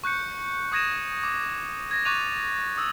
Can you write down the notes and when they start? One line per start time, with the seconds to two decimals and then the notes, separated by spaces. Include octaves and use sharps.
0.04 C#6 F#6 G6 C#7
0.72 C#6 D#6 G#6 A#6 D#7 E7
1.24 D6
1.91 G#6 A#6
2.05 C#6 D6 F#6 A6 D#7 F7
2.77 D#6 E6 G#6